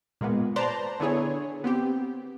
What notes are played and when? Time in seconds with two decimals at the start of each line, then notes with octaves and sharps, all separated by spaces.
0.21 A#2 G#3 A#3 B3
0.56 B4 C5 D5 A5 A#5 C6
1.00 D3 B3 D4 E4 G#4 C#5
1.64 B3 C4 G4